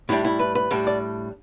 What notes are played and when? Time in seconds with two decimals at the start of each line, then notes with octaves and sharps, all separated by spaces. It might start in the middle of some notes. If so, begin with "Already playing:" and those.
0.09 A2 G3 D4 E4
0.25 E4
0.39 B4
0.55 B4
0.71 A2 G3 D4
0.87 D5